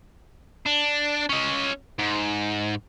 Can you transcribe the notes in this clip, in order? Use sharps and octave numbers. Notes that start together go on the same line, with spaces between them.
D4
C#4 D#5
G#2